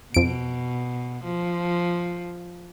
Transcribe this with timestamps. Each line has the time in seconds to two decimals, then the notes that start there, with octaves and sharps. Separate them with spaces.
0.14 F2 B2 D7
1.24 F3